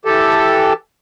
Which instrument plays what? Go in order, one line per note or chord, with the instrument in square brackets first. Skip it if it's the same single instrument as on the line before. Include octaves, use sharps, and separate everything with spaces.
[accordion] E3 G4 A4